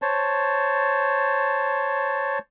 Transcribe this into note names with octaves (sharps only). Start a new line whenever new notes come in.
C5 C#5 A5